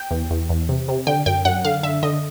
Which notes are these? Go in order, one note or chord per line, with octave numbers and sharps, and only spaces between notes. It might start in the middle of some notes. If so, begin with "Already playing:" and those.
Already playing: G5
E2
E2
E2
C3
C3
D3 G5
F#2 G5
F#2 F#5
D3 F5
D3 E5
D3 D#5